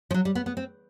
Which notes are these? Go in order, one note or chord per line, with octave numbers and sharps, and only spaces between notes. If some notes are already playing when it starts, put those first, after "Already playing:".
F3
F#3
G3
B3
B3
C4